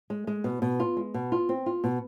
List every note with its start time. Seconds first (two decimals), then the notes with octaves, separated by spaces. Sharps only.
0.10 G#3
0.27 G#3
0.44 B2
0.62 B2
0.80 F4
0.97 G#3
1.14 B2
1.32 F4
1.49 C4
1.66 F4
1.84 B2